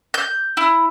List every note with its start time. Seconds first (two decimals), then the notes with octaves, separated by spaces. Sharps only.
0.14 G6
0.57 E4